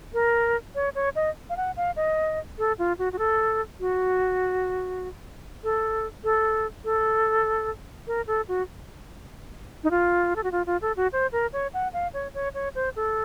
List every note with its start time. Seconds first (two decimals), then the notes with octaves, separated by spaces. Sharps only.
0.14 A#4
0.75 C#5
0.95 C#5
1.16 D#5
1.50 F5
1.57 F#5
1.77 F5
1.96 D#5
2.58 A4
2.79 F4
2.99 F#4
3.13 F#4
3.19 A4
3.80 F#4
5.64 A4
6.24 A4
6.85 A4
8.07 A#4
8.27 A4
8.48 F#4
9.84 D#4
9.91 F4
10.36 A4
10.44 F#4
10.52 F4
10.66 F4
10.82 A4
10.97 F#4
11.13 C5
11.32 A#4
11.53 C#5
11.74 F#5
11.93 F5
12.14 C#5
12.34 C#5
12.54 C#5
12.75 C5
12.96 A4